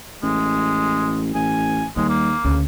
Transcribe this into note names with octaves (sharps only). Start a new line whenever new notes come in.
A1 G#3
A1 G#5
D#2 G3 G#3
A#3
D2 C#3